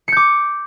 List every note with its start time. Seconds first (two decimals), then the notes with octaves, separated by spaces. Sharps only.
0.08 C#7
0.12 G6
0.17 D6